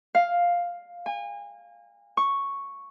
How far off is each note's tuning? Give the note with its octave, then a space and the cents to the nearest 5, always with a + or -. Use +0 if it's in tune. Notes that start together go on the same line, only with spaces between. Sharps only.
F5 +5
G#5 -35
C#6 +0